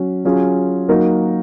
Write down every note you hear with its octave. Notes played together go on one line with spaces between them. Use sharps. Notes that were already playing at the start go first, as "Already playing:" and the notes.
Already playing: F#3 C#4 F#4
F#3 C#4 F4 G#4
F#3 A#3 D#4 F#4 A#4